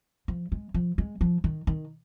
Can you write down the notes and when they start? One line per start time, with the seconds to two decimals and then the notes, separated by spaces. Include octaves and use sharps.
0.28 F3
0.52 G#3
0.74 F3
0.98 G#3
1.21 F3
1.44 D#3
1.67 D#3